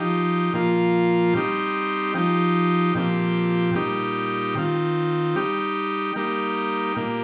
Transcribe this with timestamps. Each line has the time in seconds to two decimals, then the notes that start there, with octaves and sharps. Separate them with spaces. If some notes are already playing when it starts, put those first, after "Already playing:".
Already playing: F3 D#4 G4
0.53 A#2 F3 A#3 F4
1.33 G3 C4 D#4 G4
2.14 F3 D#4 G4
2.94 A#2 F3 C4 G4
3.75 A#2 G3 D#4 G4
4.55 D#3 C4 F4
5.36 G3 D#4 G4
6.16 G3 A#3 D#4 G4
6.96 A#2 A#3 G4